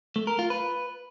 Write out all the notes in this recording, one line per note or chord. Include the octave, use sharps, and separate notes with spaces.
A3
A#4
F4
B4